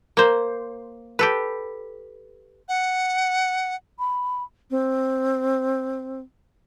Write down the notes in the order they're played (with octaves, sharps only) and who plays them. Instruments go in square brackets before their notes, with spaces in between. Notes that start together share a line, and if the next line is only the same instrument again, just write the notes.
[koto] A#3 C5
G4 A4 B4
[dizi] F#5
[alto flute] B5
C4